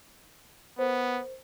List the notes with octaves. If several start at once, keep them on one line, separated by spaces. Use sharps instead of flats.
B3 A#4 C5